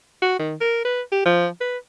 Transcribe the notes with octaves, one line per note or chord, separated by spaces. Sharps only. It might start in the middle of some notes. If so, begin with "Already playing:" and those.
F#4
D#3
A#4
B4
G4
F3
B4